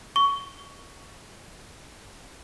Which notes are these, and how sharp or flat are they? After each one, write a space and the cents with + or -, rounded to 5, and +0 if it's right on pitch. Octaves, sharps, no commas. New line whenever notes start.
C#6 +15